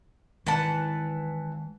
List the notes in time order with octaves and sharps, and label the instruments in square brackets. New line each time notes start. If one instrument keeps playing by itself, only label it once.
[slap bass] D#3 G#3 [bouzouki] E3 F#5 A5